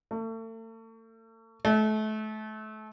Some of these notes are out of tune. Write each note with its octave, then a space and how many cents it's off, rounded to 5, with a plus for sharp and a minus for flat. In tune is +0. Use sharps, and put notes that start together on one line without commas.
A3 +40
A3 -30